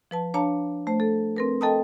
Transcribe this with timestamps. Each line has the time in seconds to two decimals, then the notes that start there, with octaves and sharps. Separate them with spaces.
0.11 F3 B4 A5
0.34 D4 C#5 F5 A5 A#5
0.87 A3 C5
1.00 A4
1.36 C4 A#4 B4
1.61 A4 D#5 G5 A5 A#5 D#6